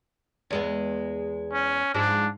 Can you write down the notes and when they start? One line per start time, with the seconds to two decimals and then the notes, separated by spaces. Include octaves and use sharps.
0.50 E2 G#3 B3
1.53 C#4
1.94 G#2 F3 G#3 D4